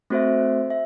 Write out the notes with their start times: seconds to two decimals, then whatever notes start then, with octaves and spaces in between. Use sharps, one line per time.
0.10 A3 C4 F#4 C5 E5
0.70 E5